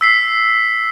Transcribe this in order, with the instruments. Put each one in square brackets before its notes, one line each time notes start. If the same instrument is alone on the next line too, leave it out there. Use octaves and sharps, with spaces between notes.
[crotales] E6 B6 C7